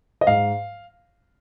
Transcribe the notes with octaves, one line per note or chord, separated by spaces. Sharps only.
D#5
G#2 F5